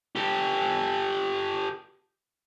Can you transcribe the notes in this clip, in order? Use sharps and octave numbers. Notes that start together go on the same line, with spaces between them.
G4 A4